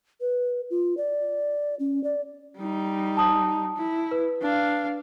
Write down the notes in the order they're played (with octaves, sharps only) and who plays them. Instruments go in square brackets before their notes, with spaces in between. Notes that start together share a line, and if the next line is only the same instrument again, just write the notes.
[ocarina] B4
F4
D5
C#4
D5
[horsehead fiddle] G3 D#4
[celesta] A5 D#6
[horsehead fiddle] E4
[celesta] B4
[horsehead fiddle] D4 F5